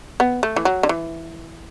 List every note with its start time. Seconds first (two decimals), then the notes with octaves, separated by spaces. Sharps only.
0.20 B3
0.43 A3
0.56 E3
0.65 F#3
0.83 D3
0.89 E3